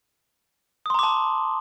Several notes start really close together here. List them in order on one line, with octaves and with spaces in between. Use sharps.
D#6 C6 A#5 D6 A5